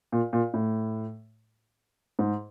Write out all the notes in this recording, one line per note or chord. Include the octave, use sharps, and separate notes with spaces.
A#2
A#2
A2
G#2